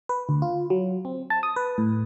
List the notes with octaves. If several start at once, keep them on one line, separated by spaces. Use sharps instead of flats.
B4
D2
F4
F#3
C4
A5
D#6
B4
A2